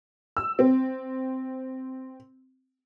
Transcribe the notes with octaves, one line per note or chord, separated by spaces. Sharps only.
E6
C4